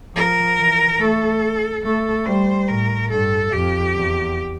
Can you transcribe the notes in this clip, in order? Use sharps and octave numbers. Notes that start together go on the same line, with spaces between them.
F3 A#4
E3
A3 A4
A3 A4
G3 C5
A2 A#4
G2 A4
F2 G4
E2